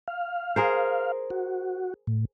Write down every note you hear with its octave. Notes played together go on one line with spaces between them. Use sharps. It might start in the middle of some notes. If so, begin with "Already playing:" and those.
F5
G#4 A#4 C5
F#4
A2